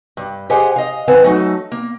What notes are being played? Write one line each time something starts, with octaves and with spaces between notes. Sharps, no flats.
G2
G4 G#4 C5 D#5 F#5 G#5
D#5 F5
G#2 C4 B4 F#5 G#5
F#3 A3 D#4 A4
A#3